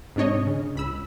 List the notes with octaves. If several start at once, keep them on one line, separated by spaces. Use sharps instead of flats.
G#2 C3 D4 C#5 D#5
C#3
C#2 B5 E6